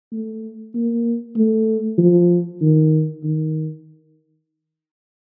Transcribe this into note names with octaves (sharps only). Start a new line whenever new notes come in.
A3
A#3
A3
F3
D#3
D#3